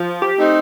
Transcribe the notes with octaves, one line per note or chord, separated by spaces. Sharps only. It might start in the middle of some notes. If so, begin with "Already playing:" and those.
Already playing: F3
G4
A3 C4 D#4